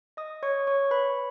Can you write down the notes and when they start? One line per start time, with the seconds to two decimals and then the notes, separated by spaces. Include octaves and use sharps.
0.17 D#5 D#6
0.43 C#5 C#6
0.67 C#5 C#6
0.91 B4 B5